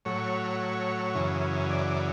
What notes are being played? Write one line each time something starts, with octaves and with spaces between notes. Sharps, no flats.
A2 F#3 C#5
F#2 C#3 E3
D5
D5